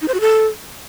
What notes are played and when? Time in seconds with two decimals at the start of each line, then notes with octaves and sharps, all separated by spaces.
0.02 D#4
0.08 C5
0.14 F#4
0.20 A4